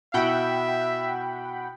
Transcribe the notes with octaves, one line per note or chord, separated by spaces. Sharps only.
B2 E4 E5 F#5 G5 B5